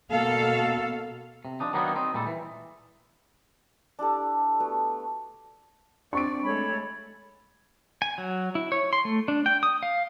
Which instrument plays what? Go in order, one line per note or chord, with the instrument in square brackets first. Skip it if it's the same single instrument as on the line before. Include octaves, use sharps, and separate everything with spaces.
[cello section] B2 A#3 A4 F5
[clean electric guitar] C3
F3 D4 D#4
D#3 F#3 A#3 B3 D4 D#4
C4 D#4
A#2 G3 G#3 A4
E3
[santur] D4 E4 G4 A4
A3 B3 F#4
[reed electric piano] C4 D4 [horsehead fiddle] D5 [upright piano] C#6 D7
[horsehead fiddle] G#3 A3 [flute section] A4 C#5 B5
[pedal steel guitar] G#5
F#3
E4
C#5
C6
A3
D4
G5
D#6
F5